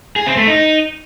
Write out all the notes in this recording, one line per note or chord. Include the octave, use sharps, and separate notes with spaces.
G#4
C4
A3
D#4